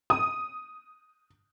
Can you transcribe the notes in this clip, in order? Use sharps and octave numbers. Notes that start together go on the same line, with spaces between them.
D#6